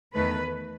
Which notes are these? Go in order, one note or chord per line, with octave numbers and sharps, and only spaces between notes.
E2 D#3 A3 B4